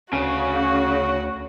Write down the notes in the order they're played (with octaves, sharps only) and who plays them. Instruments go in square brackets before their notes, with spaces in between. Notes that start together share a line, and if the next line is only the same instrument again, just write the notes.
[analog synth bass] D2 [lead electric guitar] C#3 [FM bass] C#4 [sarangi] F#4